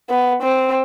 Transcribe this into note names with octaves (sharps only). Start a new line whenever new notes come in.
B3
C4